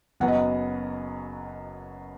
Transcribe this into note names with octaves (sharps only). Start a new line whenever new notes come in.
F#1 F#2 F#3 B3 F#5
D#5
F#5